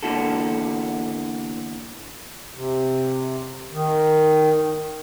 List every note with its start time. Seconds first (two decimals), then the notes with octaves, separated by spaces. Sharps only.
0.03 E2 D3 A#3 E4 F#4 A4
2.55 C3
3.72 D#3